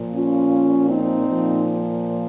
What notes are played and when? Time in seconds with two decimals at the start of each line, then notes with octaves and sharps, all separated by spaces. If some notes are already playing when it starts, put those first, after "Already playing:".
Already playing: A#2 F3
0.15 C#4 F4
0.90 C4 D#4
1.27 A#2 F3